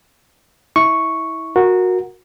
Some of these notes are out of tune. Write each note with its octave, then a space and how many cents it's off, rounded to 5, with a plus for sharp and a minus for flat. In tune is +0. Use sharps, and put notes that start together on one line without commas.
E4 -25 C#6 +0
F#4 -15 A#4 +0